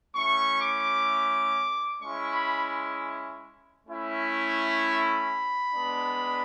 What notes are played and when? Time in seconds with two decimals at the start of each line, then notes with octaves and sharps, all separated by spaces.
0.15 A3 C#4 E4 C#6
0.62 D6
2.00 G#3 C#4 E4 C#6
2.32 B5
3.86 A3 C#4 E4
4.79 B5
5.72 G#3 B3 D4